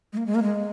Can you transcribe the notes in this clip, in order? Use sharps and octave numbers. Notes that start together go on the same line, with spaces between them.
G#3
A#3
G#3
A#3
G#3